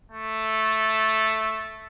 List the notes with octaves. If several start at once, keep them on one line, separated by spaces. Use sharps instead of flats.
A3